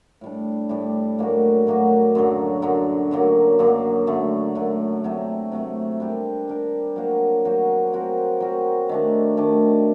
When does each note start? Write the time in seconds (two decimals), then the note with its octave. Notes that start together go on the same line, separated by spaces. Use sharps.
0.21 A2 G3 D4
0.69 A2 G3 D4
1.19 A2 F#3 A#3 F#4
1.67 A2 F#3 A#3 F#4
2.15 F#2 D3 F#3
2.62 F#2 D3 F#3
3.11 F#2 D3 F#3 A#3
3.59 F#2 D3 F#3 A#3
4.07 F#2 D3 A3
4.55 F#2 D3 A3
5.04 C3 F#3 A3 C4
5.52 C3 F#3 A3 C4
6.00 G3 D4 G4 A#4
6.48 G3 D4 G4 A#4
6.96 F#3 A#3 F#4 C5
7.45 F#3 A#3 F#4 C5
7.93 F#3 C4 F#4 A#4
8.40 F#3 C4 F#4 A#4
8.89 D#3 A3 D4
9.37 D#3 A3 D4